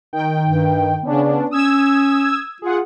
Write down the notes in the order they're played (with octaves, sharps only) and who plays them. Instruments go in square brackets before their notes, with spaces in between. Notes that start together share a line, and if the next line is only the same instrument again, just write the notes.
[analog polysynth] D#3 G5
[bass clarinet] G2
[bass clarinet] C#3 [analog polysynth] B3 C#4 D4
[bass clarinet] C#4 [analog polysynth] D#6 E6 G#6
[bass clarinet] F4 [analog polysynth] G#4 F#5